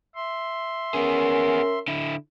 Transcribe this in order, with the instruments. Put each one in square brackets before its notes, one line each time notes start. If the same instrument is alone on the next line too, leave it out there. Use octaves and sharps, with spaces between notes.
[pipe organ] E5 C6
[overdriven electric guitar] B3 G#4 [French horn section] C#4 A#4
[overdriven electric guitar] D3 E4